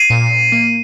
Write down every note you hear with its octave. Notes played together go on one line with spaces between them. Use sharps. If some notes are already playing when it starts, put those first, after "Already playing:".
Already playing: C7 D#7
A#2
A#2
A#3